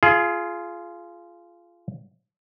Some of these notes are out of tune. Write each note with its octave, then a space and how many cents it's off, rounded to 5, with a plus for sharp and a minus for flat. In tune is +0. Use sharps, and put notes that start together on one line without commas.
F4 -15 G#4 +20